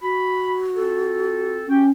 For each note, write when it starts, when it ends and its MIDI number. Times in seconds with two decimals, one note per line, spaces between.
0.02 1.56 66
0.02 0.58 83
0.74 1.62 60
0.74 1.62 65
0.74 1.62 69
1.68 1.91 61
1.68 1.83 66
1.68 1.83 67
1.68 1.83 79